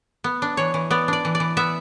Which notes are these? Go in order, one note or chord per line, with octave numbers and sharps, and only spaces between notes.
B3
D4
E3 C#5
E3
B3 D5
D4 D5
E3
D5
E3
B3 E5